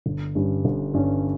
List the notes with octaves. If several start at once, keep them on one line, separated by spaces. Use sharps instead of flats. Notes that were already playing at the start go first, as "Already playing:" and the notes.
G1
G2 G3 C#4
G1
G2 G3 C#4